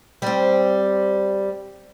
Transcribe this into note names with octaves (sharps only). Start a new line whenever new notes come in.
G3 C4